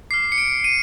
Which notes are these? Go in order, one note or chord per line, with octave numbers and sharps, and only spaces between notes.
D6 F6 C7
C#7
D7
D#7